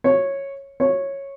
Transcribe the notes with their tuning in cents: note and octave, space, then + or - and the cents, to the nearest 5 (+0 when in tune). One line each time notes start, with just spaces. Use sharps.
C#5 -10
C#5 -10